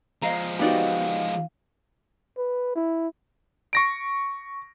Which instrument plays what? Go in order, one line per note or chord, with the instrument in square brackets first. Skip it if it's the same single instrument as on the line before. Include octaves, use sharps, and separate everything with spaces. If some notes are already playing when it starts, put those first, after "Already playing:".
[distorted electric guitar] F3 G#3 [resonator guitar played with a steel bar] D#5 F5 A#5
[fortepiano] B3 D#4 F#4 [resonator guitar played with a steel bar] G4 D5 [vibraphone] F5
[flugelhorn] B4
E4
[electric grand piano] C#6 A#6 D7